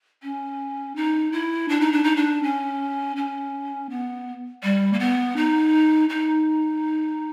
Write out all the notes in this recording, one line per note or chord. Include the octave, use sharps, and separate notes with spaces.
C#4
D#4
E4
D4
D#4
D4
D#4
D4
C#4
C#4
B3
G3
A#3
B3
D#4
D#4